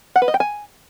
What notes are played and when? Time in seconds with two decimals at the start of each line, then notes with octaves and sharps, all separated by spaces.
0.16 F#5
0.22 B4
0.28 D#5
0.34 G5
0.40 G#5